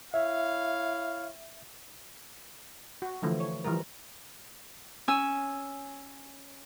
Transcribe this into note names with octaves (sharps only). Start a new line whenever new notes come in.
E4 C#5 E5 F5
F#4
D3 E3 F3 A3
C#5
E3 F3 G3 A#4
C#4 G#5 E6